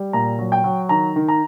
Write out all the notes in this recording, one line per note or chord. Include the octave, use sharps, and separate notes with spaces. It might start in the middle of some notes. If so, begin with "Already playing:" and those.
Already playing: G3
A#2 A#5
F#3
G5
F#3
D#3 A#5
D#3
A#5